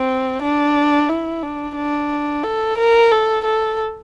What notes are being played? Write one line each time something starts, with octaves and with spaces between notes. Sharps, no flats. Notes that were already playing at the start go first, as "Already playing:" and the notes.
Already playing: C4
D4
E4
D4
D4
A4
A#4
A4
A4